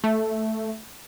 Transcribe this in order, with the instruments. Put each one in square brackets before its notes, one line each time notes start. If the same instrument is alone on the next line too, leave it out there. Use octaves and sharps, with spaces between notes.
[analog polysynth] A3